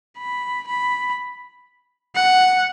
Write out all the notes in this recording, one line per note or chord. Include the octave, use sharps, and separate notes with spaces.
B5
B5
F#5